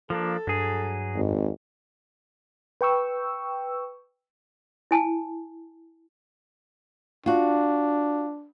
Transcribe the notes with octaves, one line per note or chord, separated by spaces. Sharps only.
F3 A#3 D4 A4
G2 F#3 G#4
G#1 F2
B4 G5 C#6 E6
E4 G#5 A5
D4 F4 F#4